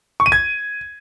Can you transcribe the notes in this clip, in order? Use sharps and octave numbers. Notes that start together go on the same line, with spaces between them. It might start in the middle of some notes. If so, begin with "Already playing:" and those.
C#6
D#7
G#6